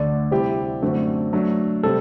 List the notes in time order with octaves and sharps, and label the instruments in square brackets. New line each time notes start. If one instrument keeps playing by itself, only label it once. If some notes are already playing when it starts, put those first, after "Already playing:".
Already playing: [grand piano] D2 D3 A3 D4 [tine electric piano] D5
[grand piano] C3 G3 C4 E4 G4
F#2 D3 A3 C4 F#4
F#3 A3 D4
[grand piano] C3 G3 C4 [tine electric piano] A4